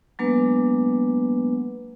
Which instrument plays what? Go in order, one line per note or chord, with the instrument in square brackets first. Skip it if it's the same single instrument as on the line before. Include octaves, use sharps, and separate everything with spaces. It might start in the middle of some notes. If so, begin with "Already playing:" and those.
[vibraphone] F#3 G#3 A#3 B3 D4 B4